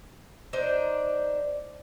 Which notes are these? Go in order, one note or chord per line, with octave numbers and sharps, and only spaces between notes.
D4 D#4 C5 D5